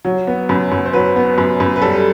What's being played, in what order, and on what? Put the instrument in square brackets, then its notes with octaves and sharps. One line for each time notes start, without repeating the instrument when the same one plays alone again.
[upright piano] F#3
B3
F#2
F#2
C5
F#3 B4
B3
F#2
F#2
B4
G3 A4